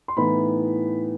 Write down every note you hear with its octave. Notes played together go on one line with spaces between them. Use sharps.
C6
A2 E3 B3 D#4 B5